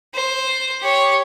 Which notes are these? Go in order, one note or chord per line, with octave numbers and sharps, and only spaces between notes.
C5
G4 C#5